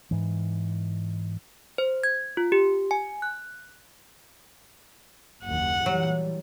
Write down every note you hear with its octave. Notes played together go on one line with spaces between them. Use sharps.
G#2 E3
C5
G#6
F4
G4
G#5
F#6
F#1 D#2 F#5
A#2 E3 F#3 G3